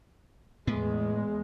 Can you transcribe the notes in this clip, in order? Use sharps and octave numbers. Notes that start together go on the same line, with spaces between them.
E2 A2 G#3 B3